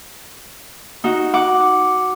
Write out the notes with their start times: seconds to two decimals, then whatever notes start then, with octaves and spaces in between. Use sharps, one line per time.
1.04 D#4 F#4
1.34 F#5 D6